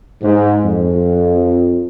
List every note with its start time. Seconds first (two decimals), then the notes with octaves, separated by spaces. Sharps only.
0.22 G#2
0.63 F2